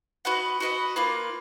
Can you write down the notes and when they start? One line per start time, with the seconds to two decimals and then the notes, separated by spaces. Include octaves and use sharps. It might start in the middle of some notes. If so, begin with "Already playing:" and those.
0.25 F#4 B4 D#5 F#5
0.60 F#4 B4 D#5 F#5
0.96 A#3 F4 B4